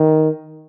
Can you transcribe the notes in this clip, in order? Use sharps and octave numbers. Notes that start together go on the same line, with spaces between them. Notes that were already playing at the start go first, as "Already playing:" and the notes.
Already playing: D#3